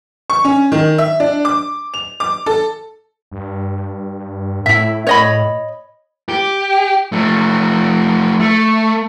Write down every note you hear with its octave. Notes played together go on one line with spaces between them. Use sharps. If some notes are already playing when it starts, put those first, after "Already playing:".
C#6
C#4
D#3
E5
D4
D6
F7
D6
A4
G2
A2 E4 E5
C#5 D#5 B5
G4
F3 A3
A3